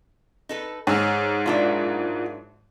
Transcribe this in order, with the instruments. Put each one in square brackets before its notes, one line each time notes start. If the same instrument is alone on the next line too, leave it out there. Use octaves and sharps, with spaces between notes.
[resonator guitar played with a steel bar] D#4 A4 B4
[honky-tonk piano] G#2 [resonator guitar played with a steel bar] D#4 G#4 [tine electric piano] C#5 E6 F6
[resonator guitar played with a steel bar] F#3 D4 E4 [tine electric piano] F4 A#4 D5